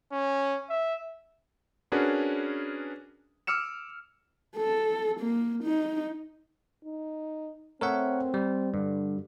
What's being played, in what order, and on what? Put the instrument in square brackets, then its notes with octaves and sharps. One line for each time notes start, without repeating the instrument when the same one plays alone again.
[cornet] C#4
E5
[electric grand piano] C#4 D4 F#4 G#4 A#4 B4
D6 E6 F6 C#7 E7
[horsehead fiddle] A4
A#3
D#4
[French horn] D#4
[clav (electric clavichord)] A3 E5 [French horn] C4 [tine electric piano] A#4 C#5 F#5
[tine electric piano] G3
[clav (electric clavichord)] G2 [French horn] D3